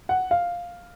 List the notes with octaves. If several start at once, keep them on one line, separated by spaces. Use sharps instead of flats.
F#5
F5